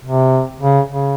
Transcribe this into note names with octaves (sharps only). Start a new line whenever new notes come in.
C3
C#3
C#3